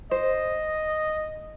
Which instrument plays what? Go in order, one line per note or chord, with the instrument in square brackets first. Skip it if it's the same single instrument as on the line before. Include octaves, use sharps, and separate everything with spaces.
[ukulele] C5 [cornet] D#5